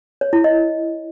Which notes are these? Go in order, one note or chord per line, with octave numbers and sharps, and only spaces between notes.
C#5
E4
D#5